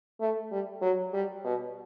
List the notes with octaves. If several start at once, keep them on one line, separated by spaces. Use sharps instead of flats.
A3
G3
F#3
G3
B2